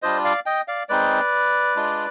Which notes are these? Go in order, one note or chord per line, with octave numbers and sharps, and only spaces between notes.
G3 D4 F4 C5 D#5
D5 F5
D#5 G5
D5 F5
G#3 C4 D#4 B4 D5
G#3 D4 F4